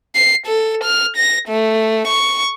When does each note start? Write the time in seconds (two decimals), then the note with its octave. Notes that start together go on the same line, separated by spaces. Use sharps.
0.15 C7
0.47 A4
0.84 F6
1.17 A#6
1.49 A3
2.08 C#6